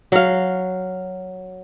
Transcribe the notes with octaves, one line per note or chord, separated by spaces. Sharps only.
F#3 F5